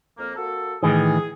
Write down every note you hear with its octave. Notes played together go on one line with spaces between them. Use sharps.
F2 A#3
A#3 F#4 A4
A2 D#3 E3 G#4